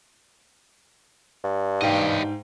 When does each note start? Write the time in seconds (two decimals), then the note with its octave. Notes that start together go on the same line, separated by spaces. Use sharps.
1.44 G2
1.82 G#2 G4 D#5 F5 G5